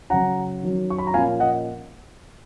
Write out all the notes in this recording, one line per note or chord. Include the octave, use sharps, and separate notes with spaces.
C#3 F#3 C#4 F#5 A#5
D#3 F#3 C#4
C#6
B5
A#5
A#2 F3 A#3 C#4 F5 G#5
D#5 F#5